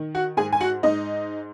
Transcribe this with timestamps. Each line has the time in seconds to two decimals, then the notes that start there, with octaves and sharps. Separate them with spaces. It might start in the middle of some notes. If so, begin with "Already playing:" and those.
Already playing: D#3
0.15 F#4 F#5
0.37 G#2 G#4 G#5
0.53 G#5
0.61 F#4 F#5
0.83 G#2 D#4 D#5